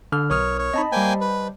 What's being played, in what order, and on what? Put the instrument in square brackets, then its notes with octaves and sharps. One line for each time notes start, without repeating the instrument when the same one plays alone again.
[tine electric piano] D3 F6
[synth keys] B1 [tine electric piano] A#4 D#6 F6 [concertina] C#5
[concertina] C#5
[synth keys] C4 D#4 [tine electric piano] D#5 A5 B5
[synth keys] G3 C5 [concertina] A#3 G5 G#5
[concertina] B4